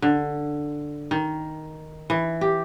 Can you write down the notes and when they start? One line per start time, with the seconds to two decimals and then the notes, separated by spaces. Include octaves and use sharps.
0.02 D3
1.11 D#3
2.10 E3
2.41 G4